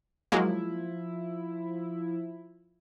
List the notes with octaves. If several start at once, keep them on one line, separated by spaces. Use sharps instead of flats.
F3 F#3 G#3 A#3 E4